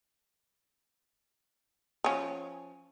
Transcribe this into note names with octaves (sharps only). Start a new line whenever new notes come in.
F3 C#4